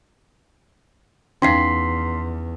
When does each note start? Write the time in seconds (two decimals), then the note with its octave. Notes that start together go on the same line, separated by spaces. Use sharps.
1.42 E2 C#4 D#4 F5 C6 B6 C7